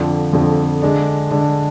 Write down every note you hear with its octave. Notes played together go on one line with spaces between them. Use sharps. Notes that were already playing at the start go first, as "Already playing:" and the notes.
Already playing: F2 D3 F3
F2 D3 F3
D3 G#3 D4
D3 G#3 D4